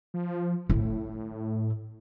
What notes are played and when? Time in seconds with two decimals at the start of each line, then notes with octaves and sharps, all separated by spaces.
0.14 F3
0.69 A2 E4